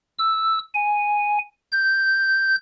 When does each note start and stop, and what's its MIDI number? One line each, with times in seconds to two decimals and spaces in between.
0.19 0.59 88
0.75 1.38 80
1.72 2.56 91